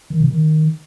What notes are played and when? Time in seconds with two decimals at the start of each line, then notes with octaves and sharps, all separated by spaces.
0.10 D#3
0.20 C3
0.30 D#3